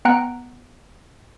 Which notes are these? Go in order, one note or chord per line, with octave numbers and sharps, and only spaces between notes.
B3 F#5 G5 A#5 F#6 D7